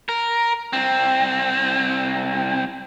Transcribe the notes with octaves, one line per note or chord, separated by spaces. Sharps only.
A#4
C2 C4